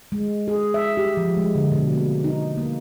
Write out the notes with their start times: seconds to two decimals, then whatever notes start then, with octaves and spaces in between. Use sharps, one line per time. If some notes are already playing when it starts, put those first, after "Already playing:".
0.12 G#3
0.48 G#4
0.74 E5
0.97 G4
1.17 F3
1.37 G#3
1.55 D3
1.72 B2
1.92 A#3
2.24 D#4
2.58 A#3